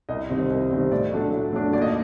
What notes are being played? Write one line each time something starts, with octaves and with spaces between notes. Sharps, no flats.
C2 D#5
C3 D#3 G3 C4
C2
C3 D#3 G3 C4
A2 D5
F#3 A3 D4
A2
F#3 A3 D4
D#2 D5
D#5